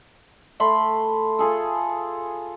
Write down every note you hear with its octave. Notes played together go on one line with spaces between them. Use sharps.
A3 B5 C6
F4 G#4 A4